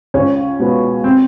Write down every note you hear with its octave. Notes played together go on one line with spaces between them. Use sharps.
C#2 C#4
B2 G#3 B3
C4